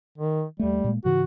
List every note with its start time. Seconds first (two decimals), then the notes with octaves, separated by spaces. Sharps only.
0.18 D#3
0.59 D#2 G3 A3
0.84 A#2 G#3 A#3
1.05 G#2 C#3 E3 F#4